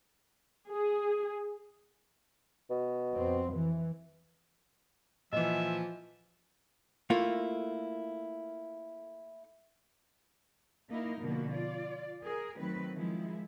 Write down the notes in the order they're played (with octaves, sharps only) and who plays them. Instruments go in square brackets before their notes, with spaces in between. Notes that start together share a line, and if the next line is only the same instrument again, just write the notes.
[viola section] G#4
[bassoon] B2
[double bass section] F2 C4
E3
[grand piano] A#2 E3 [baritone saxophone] F3 [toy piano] D#5 [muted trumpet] E5
[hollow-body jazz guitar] A3 A#3 E4 F4
[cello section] A#3 D#4 E4 A#4
B2 D3 F3 A#3 F#4
F4 D5
G#4 A#4
D#3 F#3 A3 C4 B4
D#3 F3 G#3 E4